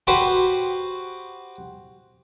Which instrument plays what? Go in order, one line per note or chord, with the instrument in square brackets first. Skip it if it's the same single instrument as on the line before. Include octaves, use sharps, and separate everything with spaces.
[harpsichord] F#4 G4 B4 C5